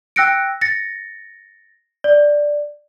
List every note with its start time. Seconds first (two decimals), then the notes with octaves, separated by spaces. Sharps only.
0.16 G5 E6 F#6 A#6 C#7 D7
0.61 A6 A#6 C#7
2.04 D5